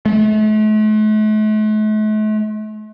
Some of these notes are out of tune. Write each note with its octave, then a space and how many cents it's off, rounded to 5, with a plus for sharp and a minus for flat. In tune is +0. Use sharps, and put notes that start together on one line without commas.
A3 -45